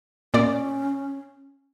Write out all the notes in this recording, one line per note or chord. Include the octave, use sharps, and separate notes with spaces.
A#2 C#4 D5